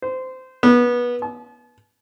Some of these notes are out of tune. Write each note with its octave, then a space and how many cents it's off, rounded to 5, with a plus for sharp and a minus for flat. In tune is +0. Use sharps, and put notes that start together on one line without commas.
C5 -20
B3 -25
A5 -45